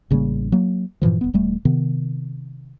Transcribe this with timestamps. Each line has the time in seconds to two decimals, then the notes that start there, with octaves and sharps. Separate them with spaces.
0.11 A1 C#3 G3 A#3
0.52 F#3 A#3
1.02 G2 A#2 E3 F3
1.21 D#1 B3
1.34 E1 G3 A3
1.65 C3 D#3 B3